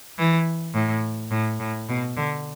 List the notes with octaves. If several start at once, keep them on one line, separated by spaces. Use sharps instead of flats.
E3
A2
A2
A2
B2
D3